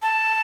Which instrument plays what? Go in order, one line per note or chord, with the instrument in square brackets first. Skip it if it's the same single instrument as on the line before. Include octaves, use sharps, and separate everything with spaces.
[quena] A5